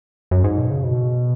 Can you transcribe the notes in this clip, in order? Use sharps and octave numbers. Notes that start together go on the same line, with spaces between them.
F#2
G#2
B2
C#3
B2